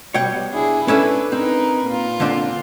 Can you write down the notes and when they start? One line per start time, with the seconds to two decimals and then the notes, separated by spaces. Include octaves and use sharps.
0.14 B2 G3 C#5 F#5 G5
0.51 D4 E4 G#4
0.88 C#4 D4 E4 A4 B4
1.32 C4 D#4 A#4 B4
1.85 A#2 F4
2.20 D3 C4 D4